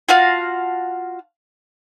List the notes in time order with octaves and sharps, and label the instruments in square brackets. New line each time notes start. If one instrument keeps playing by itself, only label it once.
[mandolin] F4 F#4 F5 A5